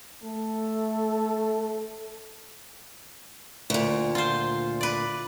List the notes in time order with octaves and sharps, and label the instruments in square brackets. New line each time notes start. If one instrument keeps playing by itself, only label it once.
[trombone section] A3 A4
[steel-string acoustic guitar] D2 A#2
[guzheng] F4 C5
B4 D5